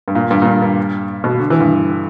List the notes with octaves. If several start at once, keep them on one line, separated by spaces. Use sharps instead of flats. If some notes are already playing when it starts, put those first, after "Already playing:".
G2
A#2
G2
A#2
G2
G2
B2
D3
E3
G2